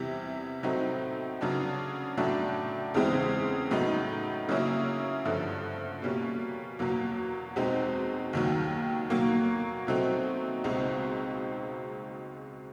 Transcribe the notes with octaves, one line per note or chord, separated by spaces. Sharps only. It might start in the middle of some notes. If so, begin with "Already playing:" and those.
Already playing: E2 C3 E3 G3
A2 F#3 A3 C4 D#4
C#3 F#3 B3 D4
A2 F#3 A3 D4
E2 C#3 E3 G#3 C4
A2 F#3 B3 D#4
C#3 F#3 A#3 C#4 E4
G2 D3 F3 A3
B2 G3 A#3 C#4
E2 B2 F#3 A#3
E2 B2 G#3 C4 D#4
D#2 D#3 F#3
B2 F#3 A#3
B2 F#3 A3 C4 D#4
C#2 B2 G#3 C4 D#4